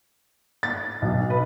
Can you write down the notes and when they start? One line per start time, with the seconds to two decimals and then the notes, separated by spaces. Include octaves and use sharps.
0.63 A6
1.02 B1
1.30 B4